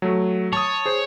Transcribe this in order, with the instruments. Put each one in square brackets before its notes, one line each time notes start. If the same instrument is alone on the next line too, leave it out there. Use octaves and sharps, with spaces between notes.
[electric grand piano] F#3 A3
[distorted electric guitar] C#5 [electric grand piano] A5 D#6
[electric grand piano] G#4 C5